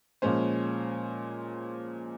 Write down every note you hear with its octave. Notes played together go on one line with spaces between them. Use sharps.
A#2 F3 G#3 C#4 C5